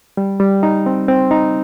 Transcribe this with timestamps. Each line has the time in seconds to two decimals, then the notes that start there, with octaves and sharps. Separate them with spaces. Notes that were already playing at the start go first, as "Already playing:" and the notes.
0.17 G3
0.40 G3
0.63 D#4
0.86 C4
1.08 C4
1.31 D#4